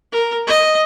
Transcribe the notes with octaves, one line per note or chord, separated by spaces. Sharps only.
A#4
D#5